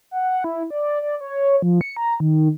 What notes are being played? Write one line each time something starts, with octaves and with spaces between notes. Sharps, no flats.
F#5
E4
D5
D5
C#5
F3
C#7
A#5
D#3